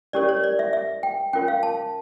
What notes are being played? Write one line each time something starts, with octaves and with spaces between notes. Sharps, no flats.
C#4 E4 G4 A#4 C#5 D5
C#5
D5
E5
E5
G5
C#4 F4 A#4 C#5 G5
F5
A5